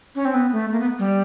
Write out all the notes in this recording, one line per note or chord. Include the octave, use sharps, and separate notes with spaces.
C#4
C4
B3
A3
A#3
B3
G3